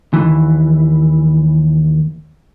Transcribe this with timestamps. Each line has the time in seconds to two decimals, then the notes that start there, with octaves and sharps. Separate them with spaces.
0.14 D#2 E3